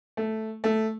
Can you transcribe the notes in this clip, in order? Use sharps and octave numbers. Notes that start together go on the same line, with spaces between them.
A3
A3